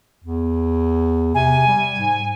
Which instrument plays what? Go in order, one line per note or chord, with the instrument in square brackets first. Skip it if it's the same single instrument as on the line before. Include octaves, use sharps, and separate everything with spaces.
[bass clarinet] E2
[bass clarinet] C3 [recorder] G#5
[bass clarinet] G3
G#2